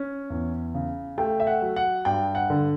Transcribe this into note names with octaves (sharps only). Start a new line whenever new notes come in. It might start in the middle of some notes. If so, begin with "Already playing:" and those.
Already playing: C#4
E2
C#3
A3 G5
E5
F#5
F#3
F#5
G2 G5
F#5
D3